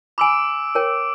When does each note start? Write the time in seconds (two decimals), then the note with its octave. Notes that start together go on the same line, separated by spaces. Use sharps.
0.18 G#5 B5 D6 E6 D7
0.75 A#4 C#5 G5